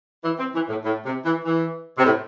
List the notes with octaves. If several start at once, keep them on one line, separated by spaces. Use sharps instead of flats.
E3
C4
E3
A2
A2
C3
E3
E3
C3
A2